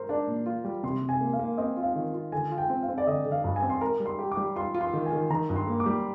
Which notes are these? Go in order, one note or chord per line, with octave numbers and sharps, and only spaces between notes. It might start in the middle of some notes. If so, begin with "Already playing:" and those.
Already playing: A#4 C5
D4 D5
A#2
F4
G3
C3 C6
C3
G#5
A#3
F5
A#3
C4 D#5
F4
F5
D#3
F4
D3 G#5
F4
G5
C4
F5
C4
D5
D3 D#5
D3
F5
G2
G#5
C4
C6
A#4 A#5
G3
C6
G4
D6
G3
F4 C6
F4
C6
D#3
G#5
D#3
D#3 A#5
G2
C6
A#3
D6
G3